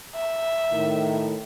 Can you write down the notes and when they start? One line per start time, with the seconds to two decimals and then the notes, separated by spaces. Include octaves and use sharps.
0.15 E5
0.72 A2 D#3